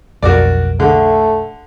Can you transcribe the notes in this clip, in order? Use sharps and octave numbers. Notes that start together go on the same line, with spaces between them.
B1 F2 F#4 A#4 D5
D3 A3